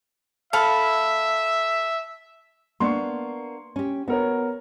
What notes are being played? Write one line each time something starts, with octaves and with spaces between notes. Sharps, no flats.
A4 E5 F5 B5
A#3 B3 D4 C6 C#6
C#4 G4
B3 F#4 A#4 C#5